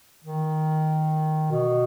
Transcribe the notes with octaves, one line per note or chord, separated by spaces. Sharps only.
D#3
B2